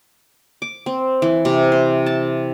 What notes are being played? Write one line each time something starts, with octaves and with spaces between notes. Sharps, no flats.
D6
C4
E3
C3
C5
A5